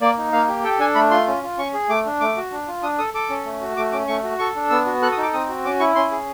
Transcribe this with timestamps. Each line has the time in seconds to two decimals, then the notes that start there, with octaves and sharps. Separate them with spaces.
0.01 A#3 D5
0.18 D#4
0.32 A#3 F5
0.48 G4
0.64 A4 G5
0.79 D4 G#5
0.95 A3 B5
1.11 F4 C6
1.27 C#4
1.43 F4
1.57 C#4 C#6
1.74 G#4
1.89 A3 D6
2.06 D4
2.20 A3 D6
2.37 F#4
2.52 D4
2.68 F4
2.82 D4 D#6
2.98 A4 D#6
3.14 A4 D6
3.30 C#4
3.45 A3
3.61 F#4
3.77 A3 D6
3.92 C#4 D6
4.08 A3 C#6
4.23 F#4
4.39 A4 C#6
4.56 D4
4.70 B3 E6
4.86 F#4
5.02 A4 F#6
5.12 D#6
5.17 D#4 D6
5.33 C4 D#6
5.49 F#4
5.64 C#4 D6
5.80 E4 C#6
5.95 C#4 C6
6.11 G#4